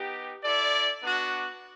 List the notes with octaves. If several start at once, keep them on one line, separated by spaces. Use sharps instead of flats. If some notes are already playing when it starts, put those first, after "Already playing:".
Already playing: B3 D#4 G4
E4 A4 D5
B3 D4 F#4